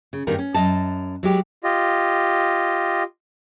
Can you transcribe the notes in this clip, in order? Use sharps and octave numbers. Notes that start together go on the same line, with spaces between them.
C#3
G2 D#3 G3 B3 G#4 A#4
C#4
F#2 D#3 D#5 A5
F#3 G#3 G4
F4 G4 D#5